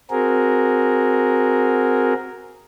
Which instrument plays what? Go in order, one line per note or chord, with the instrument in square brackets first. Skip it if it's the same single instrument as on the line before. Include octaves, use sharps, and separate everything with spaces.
[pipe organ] C4 F#4 G#4 A#4